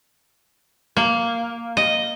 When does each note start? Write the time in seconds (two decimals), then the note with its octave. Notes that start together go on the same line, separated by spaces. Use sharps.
0.97 A#3
1.77 D#5